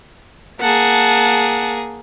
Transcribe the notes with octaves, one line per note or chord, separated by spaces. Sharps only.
A#3 G#4 F#5 A5